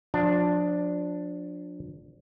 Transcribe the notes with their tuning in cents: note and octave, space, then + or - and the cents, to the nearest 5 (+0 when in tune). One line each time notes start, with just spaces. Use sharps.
F3 +35 D4 +0